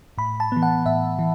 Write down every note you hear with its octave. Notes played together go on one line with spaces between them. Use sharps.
A2 B5
A5
E3 B3
F#5
A2 E5
E3